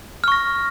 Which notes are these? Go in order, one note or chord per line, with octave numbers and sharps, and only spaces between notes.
C#6 F6 A#6